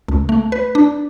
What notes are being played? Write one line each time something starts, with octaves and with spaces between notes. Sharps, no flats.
C#2
A3
B4
D4